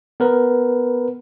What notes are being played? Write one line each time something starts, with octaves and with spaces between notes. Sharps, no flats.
B3 A#4 B4